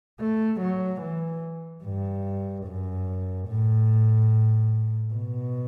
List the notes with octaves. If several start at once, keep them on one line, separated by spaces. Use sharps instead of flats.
A3
F#3
E3
G2
F#2
A2
B2